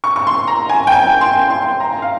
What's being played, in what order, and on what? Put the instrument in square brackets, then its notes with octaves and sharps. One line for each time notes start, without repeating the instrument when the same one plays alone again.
[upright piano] C#6
C#6
C6
A#5
G#5
G5
G#5
C6
C6
A#5
F5